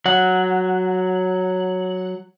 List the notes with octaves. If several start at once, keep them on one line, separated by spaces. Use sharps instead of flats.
F#3 F#5